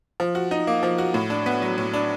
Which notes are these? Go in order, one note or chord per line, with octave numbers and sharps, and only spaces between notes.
F3
F#4
D#4
A#3
F3
F#4
A2
D4
B3
F#3
A2
D4